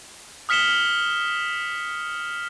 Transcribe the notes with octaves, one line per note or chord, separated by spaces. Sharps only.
D#6 F6 B6 C#7 E7 G7